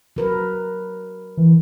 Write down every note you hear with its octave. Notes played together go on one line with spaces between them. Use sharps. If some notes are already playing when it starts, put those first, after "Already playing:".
F#3 A#4 B4
E3